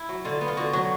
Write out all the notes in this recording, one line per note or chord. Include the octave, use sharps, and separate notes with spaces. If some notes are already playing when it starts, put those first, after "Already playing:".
Already playing: E4
F#3
D3 F4
B3
F4
D3 F#4
F#3 F#4